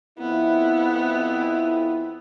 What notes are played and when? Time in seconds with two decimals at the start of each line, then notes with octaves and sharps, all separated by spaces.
0.19 F2 B3 E4